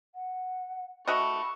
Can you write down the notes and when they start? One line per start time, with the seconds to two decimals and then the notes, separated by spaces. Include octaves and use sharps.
0.15 F#5
1.07 A3 F#4 D#5 B5 C#6